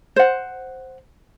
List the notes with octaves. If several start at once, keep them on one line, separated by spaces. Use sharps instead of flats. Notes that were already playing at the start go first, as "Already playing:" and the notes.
C5 F#5